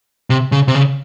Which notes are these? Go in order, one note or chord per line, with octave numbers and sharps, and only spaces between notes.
C3
C#3
C3
C#3